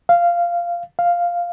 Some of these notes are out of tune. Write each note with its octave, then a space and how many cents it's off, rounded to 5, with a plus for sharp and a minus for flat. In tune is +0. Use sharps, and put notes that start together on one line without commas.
F5 -10
F5 +0